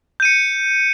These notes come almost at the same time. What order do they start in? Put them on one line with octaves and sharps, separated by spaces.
G6 D#7 C#7